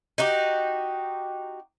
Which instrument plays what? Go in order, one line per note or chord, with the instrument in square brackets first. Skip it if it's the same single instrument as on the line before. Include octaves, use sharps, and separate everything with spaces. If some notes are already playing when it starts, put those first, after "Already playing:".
[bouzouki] D#4 F#4 G4